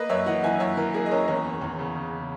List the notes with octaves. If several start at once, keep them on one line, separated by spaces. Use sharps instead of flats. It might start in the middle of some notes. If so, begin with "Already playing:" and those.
Already playing: A#3 B4 D#5
F#2 C#5 E5
E3 D#5 F#5
E3 E5 G#5
F#2 C#5 E5
E3 A#4
A#3 G#4
D#5
C#4 A#4 C#5
E2 A#4 C#5
E2
E2
C#3
C#3